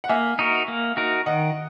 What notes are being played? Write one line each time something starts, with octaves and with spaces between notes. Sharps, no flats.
F#5
A#3 E5 G#5
D#4 F#4 A#4
A#3
D#4 F#4 A#4
D#3 D#5 F#5